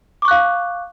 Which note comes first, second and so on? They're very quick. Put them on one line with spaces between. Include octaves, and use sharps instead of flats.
D6 C#6 F#6 F5